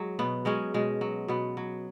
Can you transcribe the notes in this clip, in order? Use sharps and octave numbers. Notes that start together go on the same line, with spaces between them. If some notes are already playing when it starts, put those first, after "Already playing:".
Already playing: F#3 G#3
B2 B3
F#3 G#3 C#4
B2 G#3
F#3
B2 B3
F#3